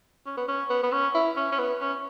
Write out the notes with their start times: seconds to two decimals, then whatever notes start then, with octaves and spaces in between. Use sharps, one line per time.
0.26 C#4
0.37 B3
0.48 C#4
0.70 B3
0.83 B3
0.92 C#4
1.15 E4
1.37 C#4
1.52 C#4
1.59 B3
1.81 C#4